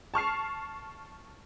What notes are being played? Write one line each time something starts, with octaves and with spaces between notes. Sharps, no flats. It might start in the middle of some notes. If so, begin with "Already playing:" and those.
A5 C#6 F6 C7